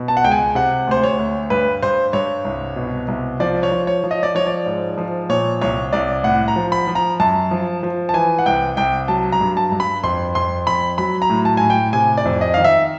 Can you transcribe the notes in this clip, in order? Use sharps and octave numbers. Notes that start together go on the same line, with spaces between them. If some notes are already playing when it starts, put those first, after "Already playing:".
Already playing: B2
A5
F#5
C#2 G5
G#5
C3 F#5
D2 C5
C#5
D2
G2 B4
G2 C5
G2 C#5
C2
B2
C2
F3 D5
C#5
F3
C#5
F3
D#5
D5
F3 C#5
D5
G#2
F3
A#2 C#5
C2 C#5
C2 D5
A2 F#5
A#5
F3
B5
F3
A#5
F#2 A5
F3
F3
A5
E3 G#5
F#5
C2 G5
C2 G5
F#3 A5
A#5
G2
A5
G2
B5
F2 C6
F2 C6
F2 B5
F#3 B5
A#5
A2
A5
A2 G#5
G5
C3 G#5
D5
F2
D#5
D#3 F5
E5